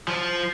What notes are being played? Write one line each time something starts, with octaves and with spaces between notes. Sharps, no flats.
F3